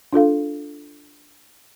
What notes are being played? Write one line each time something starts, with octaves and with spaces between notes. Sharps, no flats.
D4 F4 A4 F5